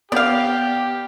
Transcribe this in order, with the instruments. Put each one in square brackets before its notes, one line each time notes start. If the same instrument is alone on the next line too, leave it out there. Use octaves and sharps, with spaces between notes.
[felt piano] B3 [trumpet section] G4 [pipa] D5 F5